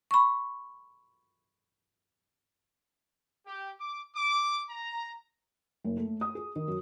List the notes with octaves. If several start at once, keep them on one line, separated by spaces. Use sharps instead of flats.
B5 C#6
G4
D6
D6
A#5
F#1
A3
D#6
G#4
D#3
F#2